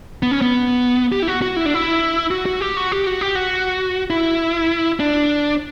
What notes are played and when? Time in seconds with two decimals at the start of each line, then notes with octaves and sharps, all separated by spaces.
0.23 B3
0.31 C#4
0.42 B3
1.12 G4
1.22 E4
1.28 F#4
1.42 F#4
1.56 E4
1.66 D4
1.74 E4
2.31 F#4
2.46 F#4
2.61 G4
2.77 F#4
2.92 G4
3.07 F#4
3.21 G4
3.35 F#4
4.10 E4
5.00 D4